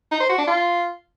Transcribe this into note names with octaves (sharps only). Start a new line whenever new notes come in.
D#4
C5
F#4
D4
F4